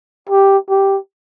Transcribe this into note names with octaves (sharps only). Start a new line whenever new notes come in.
G4
G4